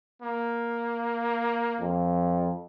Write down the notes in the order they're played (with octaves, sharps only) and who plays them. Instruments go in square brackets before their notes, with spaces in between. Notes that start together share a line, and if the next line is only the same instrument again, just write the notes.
[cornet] A#3
[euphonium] F2